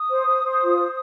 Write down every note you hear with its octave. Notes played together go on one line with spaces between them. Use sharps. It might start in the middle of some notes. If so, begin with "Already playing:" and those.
Already playing: D#6
C5
C5
C5
F4
C5